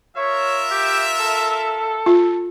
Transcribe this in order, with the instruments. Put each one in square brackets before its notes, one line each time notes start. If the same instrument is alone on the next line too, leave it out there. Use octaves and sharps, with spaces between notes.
[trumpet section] F4 A#4 E5 [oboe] C#5
[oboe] G4
A4
[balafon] F4